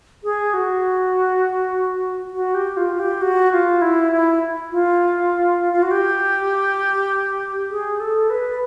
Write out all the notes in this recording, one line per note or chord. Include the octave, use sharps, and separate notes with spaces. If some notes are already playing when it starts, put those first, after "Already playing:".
G#4
F#4
F#4
G4
F4
G4
F#4
F4
E4
E4
F4
F4
F#4
G4
G#4
A4
B4